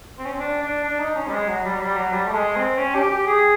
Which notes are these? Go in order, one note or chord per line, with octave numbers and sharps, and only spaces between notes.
C4
C#4
C4
D4
D4
D4
D#4
C#4
G3
G#3
F#3
G3
F#3
G3
F#3
G3
A3
G#3
C4
C#4
G4
G4
G#4